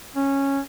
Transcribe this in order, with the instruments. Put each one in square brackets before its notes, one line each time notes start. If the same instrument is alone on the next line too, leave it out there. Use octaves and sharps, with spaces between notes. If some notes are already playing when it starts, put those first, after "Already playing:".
[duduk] C#4